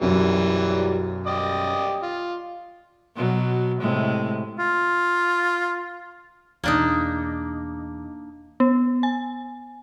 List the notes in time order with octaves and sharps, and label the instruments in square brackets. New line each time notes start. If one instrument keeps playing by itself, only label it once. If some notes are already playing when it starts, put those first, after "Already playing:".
[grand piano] B1 F#2 [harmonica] E3 F#3 G3
[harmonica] G4 D5 D#5
F4
[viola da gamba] B2 F#3
A2 C3 G#3
[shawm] F4
[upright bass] E2 B2 [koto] A#3 D4 D#4
[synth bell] B3
G#5